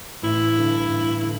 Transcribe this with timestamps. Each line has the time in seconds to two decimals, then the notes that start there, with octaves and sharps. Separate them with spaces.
0.22 A1 E4
0.57 G2 D3
0.89 A1
1.22 D3